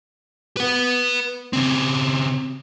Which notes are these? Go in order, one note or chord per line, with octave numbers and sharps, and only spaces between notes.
B4 F#5
C#3 C4